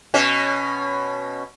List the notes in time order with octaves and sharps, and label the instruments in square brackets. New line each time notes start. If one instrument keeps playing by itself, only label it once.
[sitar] B2 C#4